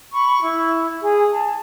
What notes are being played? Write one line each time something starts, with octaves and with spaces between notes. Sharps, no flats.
B5 C#6
E4
G#4
A5